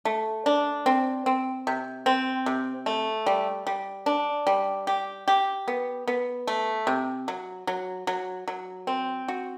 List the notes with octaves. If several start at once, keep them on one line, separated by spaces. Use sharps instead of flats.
A3
D4
C4
C4
C3
C4
C3
A3
G3
G3
D4
G3
G4
G4
B3
B3
A3
C3
F#3
F#3
F#3
F#3
C4
F#4